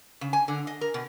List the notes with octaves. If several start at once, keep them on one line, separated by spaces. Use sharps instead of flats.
C#3
G#5
D3
D#5
A#4
B2